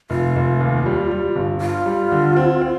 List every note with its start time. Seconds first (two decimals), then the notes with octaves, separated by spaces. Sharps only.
0.10 F1 F4
0.36 F1
0.60 D#2
0.86 G3
1.11 G3
1.36 G1
1.61 G2 F4
1.86 G3
2.12 D3
2.37 C4
2.62 C4